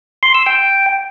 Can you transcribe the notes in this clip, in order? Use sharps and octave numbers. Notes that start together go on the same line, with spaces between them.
C6
E6
G5